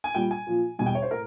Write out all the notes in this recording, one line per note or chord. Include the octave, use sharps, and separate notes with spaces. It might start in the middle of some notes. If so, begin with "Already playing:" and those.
G#5
A#2 G3 G5
G#5
A#2 F3
E2 B2 G3 G#5
G5
C#5
C5
A2 A#4